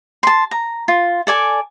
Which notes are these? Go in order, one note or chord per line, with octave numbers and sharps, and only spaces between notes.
A5 C6
A#5
F4
A4 D5 G#5 D6